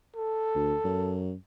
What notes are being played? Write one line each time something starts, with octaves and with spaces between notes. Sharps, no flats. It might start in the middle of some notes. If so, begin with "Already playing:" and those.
A4
D2
F#2